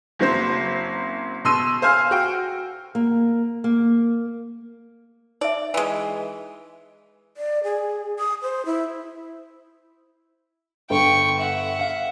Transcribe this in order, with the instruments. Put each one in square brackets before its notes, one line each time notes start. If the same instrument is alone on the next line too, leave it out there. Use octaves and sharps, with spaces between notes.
[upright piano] F#1 F#3 C4 C5
B2 C6 E6 D#7
C5 F5 G#5 F6
F#4 G5
[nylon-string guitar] A#3
A#3
[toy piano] D#4 E5 [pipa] D5
[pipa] E3 G#3
[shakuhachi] D5
G#4
D#6
C5
E4
[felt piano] G1 A4 [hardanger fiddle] G5 C#6
[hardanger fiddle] E5 F#5
[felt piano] F5